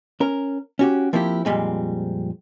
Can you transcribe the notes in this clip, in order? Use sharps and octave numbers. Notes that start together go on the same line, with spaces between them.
C#4 A#4
C#4 F#4 G4
F3 A#3 C4 D#4 E4 G4
F2 A#2 G3 G#3 C4